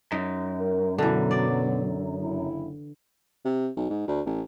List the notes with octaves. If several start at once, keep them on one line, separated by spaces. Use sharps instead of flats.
F#2 D#4
A#4
B2 D3 E3 F#3
D5
F#1 E4
C3
B1
G#2
D2
A1